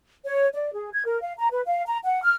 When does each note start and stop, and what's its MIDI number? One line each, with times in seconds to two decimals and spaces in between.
0.25 0.47 73
0.54 0.72 74
0.74 0.90 68
0.93 1.02 92
1.06 1.18 70
1.22 1.33 77
1.39 1.48 82
1.52 1.61 71
1.66 1.83 77
1.87 1.97 82
2.04 2.23 78
2.23 2.35 89